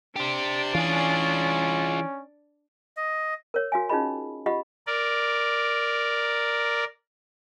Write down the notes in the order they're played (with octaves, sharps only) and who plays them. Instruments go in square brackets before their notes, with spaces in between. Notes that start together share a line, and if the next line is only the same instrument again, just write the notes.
[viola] D4 D5 [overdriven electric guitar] G4 C5
[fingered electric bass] E3 [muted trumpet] C#4 [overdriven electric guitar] F4 G#4
[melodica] D#5
[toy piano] A#4 C#5
F#4 F5 G#5
C#4 D#4 F4 G#4 D#5 B5
F4 G4 D#5 F#5 B5
[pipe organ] A#4 D5